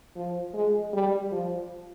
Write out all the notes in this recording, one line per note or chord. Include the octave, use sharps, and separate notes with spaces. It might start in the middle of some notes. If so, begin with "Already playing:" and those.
F3
G#3
G3
F3